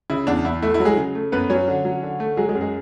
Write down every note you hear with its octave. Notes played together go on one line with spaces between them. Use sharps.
C#3 E4
E2 D4
E2 E4
A3 E4
E4
F#3
G#3 G#4
C#3
A3
F#2 B3 B4
B4
F#3 C#4 C#5
D3
F#3
D3
A3
F#3 G#3 G#4
G#3 G#4
F#2
G#3 G#4